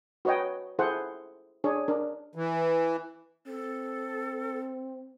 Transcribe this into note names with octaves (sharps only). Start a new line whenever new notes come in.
F#4 B4 C#5 D#5 G5
E4 G#4 A4 C5 F#5
D4 G#4 C#5
D4 A#4
E3
C4 A4